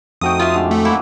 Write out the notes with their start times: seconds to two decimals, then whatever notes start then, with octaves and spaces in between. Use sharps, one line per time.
0.21 F2 A3 C4 D#4 F#4 G5 D#6
0.39 F4 E5
0.54 A2 D3 G#3
0.71 A3
0.85 F#3 A#3 E4